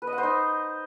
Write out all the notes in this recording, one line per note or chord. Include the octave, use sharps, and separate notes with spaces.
B4
D#5
F#5
C5
D#4